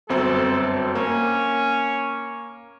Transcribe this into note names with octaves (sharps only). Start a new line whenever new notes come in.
G1 F#2 C4 A4
A#3 C#4